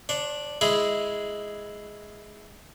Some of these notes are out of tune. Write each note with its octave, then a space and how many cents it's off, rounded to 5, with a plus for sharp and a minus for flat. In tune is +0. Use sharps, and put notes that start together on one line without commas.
D4 +0 C#5 -45
G#3 +0 E4 -5 G#4 +0